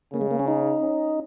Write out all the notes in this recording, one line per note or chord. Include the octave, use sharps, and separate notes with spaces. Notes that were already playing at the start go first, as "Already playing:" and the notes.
C#3 A#3
G#3
A#3
C#4
D#4
C#4